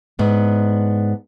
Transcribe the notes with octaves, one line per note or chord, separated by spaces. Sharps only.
G#2 B3 D4